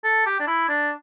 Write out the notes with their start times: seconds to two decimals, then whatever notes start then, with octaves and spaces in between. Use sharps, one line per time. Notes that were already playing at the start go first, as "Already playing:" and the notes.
0.04 A4
0.26 G4
0.40 D4
0.47 E4
0.69 D4